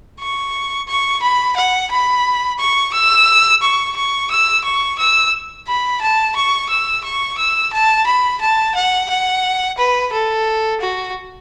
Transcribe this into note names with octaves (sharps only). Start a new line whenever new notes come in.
C#6
C#6
B5
F#5
B5
C#6
E6
C#6
C#6
E6
C#6
E6
B5
A5
C#6
E6
C#6
E6
A5
B5
A5
F#5
F#5
B4
A4
F#4